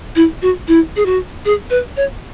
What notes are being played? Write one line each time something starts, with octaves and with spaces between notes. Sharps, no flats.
E4
F#4
E4
G#4
F#4
G#4
B4
C#5